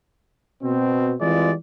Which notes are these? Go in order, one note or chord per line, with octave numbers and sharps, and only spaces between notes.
B2 C4
E3 G3 G#3 C4 F4 D5